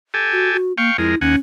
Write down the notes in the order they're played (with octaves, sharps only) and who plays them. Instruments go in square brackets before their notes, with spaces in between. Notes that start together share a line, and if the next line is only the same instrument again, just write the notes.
[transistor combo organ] G4 A4 G#5
[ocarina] F#4
F#4
[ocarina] A#3 [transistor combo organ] F5 G5 C#6
[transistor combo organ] F2 G#3 A#4 [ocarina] E4
[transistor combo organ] D#2 F#5 G#5 [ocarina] C#4